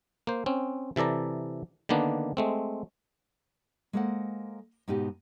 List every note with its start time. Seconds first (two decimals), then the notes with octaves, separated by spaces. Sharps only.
0.27 A#3 C5
0.46 C4 C#4
0.96 C3 E3 A4 D5 A#5
1.89 D3 D#3 A#3 B3 D4
2.37 G#3 A3 C4
3.93 G#3 A#3 A4 C5 F#5
4.88 G#2 B2 D#4 G4